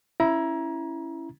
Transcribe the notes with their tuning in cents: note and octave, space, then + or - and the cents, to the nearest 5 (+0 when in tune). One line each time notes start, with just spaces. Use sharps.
C#4 +0 E4 +5 A#5 +25